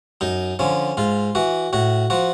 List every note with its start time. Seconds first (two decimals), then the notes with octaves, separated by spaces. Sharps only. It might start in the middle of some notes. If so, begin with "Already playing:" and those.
0.21 F#2 D#4
0.59 D3 F3 C#4
0.97 G#2 F4
1.35 E3 F#4
1.73 A2 F#4
2.10 F3 F#4